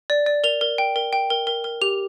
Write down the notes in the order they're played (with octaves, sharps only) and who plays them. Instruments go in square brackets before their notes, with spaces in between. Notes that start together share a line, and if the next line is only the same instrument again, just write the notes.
[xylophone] D5
D5
A#4 F7
A#4
G5
A#4
G5
A#4
A#4
A#4
G4 F7